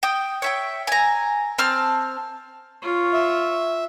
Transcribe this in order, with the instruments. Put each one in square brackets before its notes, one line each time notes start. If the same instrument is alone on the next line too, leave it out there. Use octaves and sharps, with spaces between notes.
[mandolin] G5 D#6
C#5 E5 G5
G#5 A#5
C4 A5 F6
[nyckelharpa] F4 C#5
[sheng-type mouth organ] E5